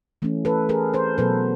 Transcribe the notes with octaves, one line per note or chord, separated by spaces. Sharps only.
E3 A3 C#4
A4 B4
G#4 A#4
A#4 C5
B2 F#3 B3 A4 B4